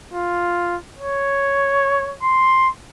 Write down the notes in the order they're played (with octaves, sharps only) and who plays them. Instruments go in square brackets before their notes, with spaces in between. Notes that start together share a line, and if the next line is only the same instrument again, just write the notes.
[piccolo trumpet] F4
C#5
C6